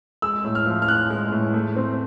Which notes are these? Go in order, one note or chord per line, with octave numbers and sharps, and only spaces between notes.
G#3 E6
A2
F6
F3
F6
A2 F#6
G#3
A2
A3
C4